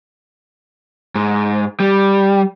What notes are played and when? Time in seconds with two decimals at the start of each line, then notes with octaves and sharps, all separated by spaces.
1.15 G#2
1.80 G3